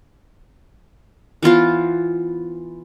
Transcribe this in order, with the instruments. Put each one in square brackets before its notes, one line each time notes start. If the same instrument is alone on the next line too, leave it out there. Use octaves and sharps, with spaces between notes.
[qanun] E3 B3 F4 C5